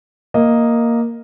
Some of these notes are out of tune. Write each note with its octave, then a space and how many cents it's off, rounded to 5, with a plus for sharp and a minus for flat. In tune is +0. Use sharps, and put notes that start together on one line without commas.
A#3 +0 D#5 +0